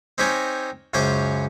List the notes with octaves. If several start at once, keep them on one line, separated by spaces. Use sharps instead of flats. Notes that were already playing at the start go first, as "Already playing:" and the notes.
C4 D#4 G4 A#4 C#5 G#5
C#2 F#2 C#4 C5 C#5 D6